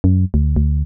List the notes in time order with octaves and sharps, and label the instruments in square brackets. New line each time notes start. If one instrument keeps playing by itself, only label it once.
[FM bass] F#2
D2
D2